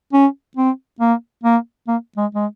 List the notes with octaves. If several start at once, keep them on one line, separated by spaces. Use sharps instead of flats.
C#4
C4
A#3
A#3
A#3
G#3
G#3